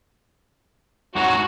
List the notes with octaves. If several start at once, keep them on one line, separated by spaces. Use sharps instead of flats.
G#2 F#3 F#4